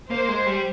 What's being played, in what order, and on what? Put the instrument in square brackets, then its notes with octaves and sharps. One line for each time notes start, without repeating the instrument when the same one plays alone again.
[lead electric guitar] A#3 [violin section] C5
[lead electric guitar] G#3
G3